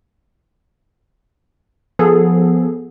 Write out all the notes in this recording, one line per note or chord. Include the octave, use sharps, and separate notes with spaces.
F3 B3 G#4 A4